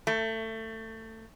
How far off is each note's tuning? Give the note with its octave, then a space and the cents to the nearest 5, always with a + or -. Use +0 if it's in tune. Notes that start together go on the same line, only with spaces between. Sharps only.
A3 +25